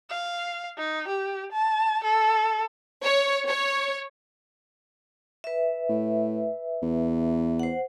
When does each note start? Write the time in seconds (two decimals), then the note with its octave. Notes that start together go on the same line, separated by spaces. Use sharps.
0.10 F5
0.78 D#4
1.08 G4
1.52 A5
2.03 A4
3.03 C#5
3.46 C#5
5.44 B4 E5
5.89 A2
6.82 E2
7.60 C5 F#5